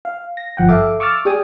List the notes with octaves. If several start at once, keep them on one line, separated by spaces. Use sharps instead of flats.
F5
A#6
G1 F3 F#5 G5
A4 E5 F5 D6
C#6 D6 E6 F6 A6
G4 G#4 D5 G5 G#5 D#6